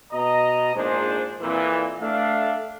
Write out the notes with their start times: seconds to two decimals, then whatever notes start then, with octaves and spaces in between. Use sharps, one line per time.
0.12 B2 D#5 A#5
0.75 A#1 G#2 G#3 D4 G#4 C5
1.42 F2 A#2 E3
2.01 A3 D4 E5 F5